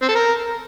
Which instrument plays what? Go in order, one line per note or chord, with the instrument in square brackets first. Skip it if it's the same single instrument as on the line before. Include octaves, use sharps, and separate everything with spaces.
[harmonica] C4
A4
A#4